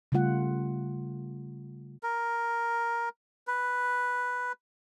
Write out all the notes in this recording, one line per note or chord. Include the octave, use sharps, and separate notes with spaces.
C#3 G3 A3 F4 F#5
A#4
B4